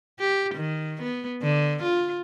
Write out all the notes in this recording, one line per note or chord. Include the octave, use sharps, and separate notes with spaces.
G4
D#3
B3
D3
F4